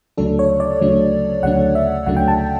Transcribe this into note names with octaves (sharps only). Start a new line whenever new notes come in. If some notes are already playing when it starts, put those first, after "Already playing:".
D2 C#3 F#3 A3 D4 A4
C#5
D5
D2 C#3 F#3 A3 D4
D2 C#3 F#3 A3 D4 F#5
E5
D2 C#3 F#3 A3 D4 F#5
G5
A5